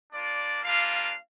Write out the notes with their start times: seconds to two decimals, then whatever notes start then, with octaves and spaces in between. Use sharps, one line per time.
0.13 A#3 D4 F4 D5
0.64 G3 A#3 D4 F4 F5